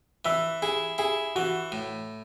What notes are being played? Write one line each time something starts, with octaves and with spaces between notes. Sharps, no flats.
E3 E5
E4 G#4
E4 G#4
E3 F#4
A2